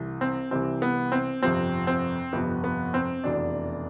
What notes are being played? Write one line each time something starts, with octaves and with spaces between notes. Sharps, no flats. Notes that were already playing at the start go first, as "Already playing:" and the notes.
Already playing: C2 C3 E3
C4
C2 C3 E3 C4
B3
C4
G1 F2 C3 F3 C4
C4
G1 F2 C3 F3 B3
B3
C4
F1 E2 B2 D4